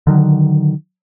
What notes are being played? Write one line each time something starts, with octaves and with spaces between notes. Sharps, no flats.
D3 D#3 F#3